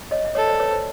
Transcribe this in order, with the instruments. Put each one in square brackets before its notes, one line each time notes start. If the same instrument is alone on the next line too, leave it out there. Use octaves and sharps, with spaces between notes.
[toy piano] C#5 D#5
E5
[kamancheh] A4 [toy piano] C#5 D#5
[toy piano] C5 D5
B4 C#5
C5